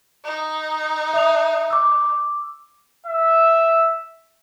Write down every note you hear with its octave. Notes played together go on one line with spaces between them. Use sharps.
D#4
E5 D#6 F7
D6 E6
E5